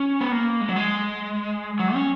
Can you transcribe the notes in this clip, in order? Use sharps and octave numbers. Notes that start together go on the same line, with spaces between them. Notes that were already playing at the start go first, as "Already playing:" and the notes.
Already playing: C#4
B3
A#3
G#3
F#3
G#3
F#3
C#4